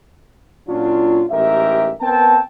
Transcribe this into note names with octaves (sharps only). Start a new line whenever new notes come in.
A#2 F#3 C#4 D4 F4
A1 G#2 G4 A#4 E5
B3 C4 A#4 G5 A5